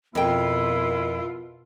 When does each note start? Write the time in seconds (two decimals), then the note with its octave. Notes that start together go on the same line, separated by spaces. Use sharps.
0.15 F2 B2 E4 F4 A#4 G5